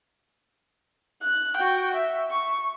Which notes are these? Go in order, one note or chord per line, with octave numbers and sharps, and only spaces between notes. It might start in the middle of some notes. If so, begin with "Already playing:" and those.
F#6
F#4 G5
E5
C#6